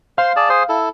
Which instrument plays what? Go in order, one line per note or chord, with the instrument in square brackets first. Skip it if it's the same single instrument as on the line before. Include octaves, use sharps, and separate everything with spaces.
[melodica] C5 C6 [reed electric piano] F5
[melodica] G#4 D5 A5
G#4 C5
E4 A4